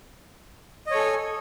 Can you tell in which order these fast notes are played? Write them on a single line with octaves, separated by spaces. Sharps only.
D#5 C#5 A4 G#5